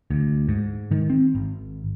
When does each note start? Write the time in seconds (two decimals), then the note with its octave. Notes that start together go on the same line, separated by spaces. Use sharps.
0.11 D2
0.48 G#2
0.91 D#3
1.10 C4
1.35 G#1